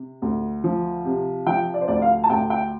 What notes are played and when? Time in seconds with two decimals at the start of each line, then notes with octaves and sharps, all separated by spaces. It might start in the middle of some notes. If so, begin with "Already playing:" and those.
Already playing: C3
0.22 D2
0.64 F3
1.05 C3
1.47 F3 G5
1.74 D5
1.81 C5
1.88 D2 D5
2.02 F5
2.24 A5
2.29 D2 G5
2.50 G5